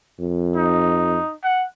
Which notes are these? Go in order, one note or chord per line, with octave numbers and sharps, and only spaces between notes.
F2
D#4
F#5